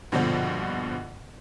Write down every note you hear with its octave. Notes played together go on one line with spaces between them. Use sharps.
A#1 G2 B2 D3 F3